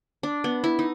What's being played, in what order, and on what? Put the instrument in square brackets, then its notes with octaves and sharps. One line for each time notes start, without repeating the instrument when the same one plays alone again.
[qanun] D4
B3
E4
D#4